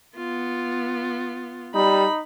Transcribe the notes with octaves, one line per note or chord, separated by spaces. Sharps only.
B3 F4
G3 D#4 B5